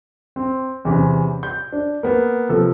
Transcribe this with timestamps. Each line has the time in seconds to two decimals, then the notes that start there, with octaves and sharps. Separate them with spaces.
0.36 C4
0.85 E2 C3 C#4
1.43 G6
1.72 D4
2.03 A#3 B3
2.49 C3 F3 A4